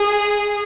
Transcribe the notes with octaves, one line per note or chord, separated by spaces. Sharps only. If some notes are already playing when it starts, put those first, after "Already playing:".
Already playing: G#4